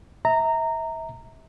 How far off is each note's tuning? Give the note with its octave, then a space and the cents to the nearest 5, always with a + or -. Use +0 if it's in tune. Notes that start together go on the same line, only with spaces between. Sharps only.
E5 -30 A#5 -15